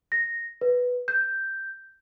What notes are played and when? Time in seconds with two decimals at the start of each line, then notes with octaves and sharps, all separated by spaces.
0.12 A#6
0.61 B4
1.08 G6